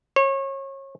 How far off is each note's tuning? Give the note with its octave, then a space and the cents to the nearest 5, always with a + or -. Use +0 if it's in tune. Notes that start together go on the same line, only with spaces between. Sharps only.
C#5 -30